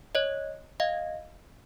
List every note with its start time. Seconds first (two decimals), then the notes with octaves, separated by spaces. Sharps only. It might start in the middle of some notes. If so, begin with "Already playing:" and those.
0.15 C#5 D#5
0.80 D#5 F5